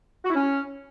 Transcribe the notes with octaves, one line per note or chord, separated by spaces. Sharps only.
F#4
E4
C#4